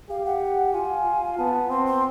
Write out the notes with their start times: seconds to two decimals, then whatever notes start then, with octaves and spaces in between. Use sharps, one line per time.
0.10 G4 F5
0.25 F#5
0.73 F4 G#5
1.37 B3 A5
1.70 C4 C6
1.86 C6